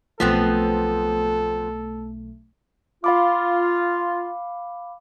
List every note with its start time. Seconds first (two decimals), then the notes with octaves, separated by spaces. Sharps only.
0.20 B1 F3 A3 B3 C4 A4
3.04 F4 F5 B5 D6